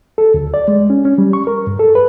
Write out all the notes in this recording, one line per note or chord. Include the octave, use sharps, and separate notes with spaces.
A4
D2
D5
G#3
C#4
C#4
G3
C#6
A#4
G2
A4
B4